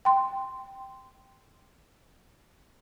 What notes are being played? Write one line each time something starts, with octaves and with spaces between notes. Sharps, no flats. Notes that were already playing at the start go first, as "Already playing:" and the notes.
G5 C6